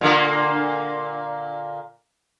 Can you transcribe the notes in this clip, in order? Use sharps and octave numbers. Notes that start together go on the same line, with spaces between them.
A#2 D3 A#3